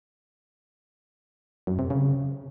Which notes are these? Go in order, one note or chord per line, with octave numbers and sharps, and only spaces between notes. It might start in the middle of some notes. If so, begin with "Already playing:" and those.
F#2
C3
C#3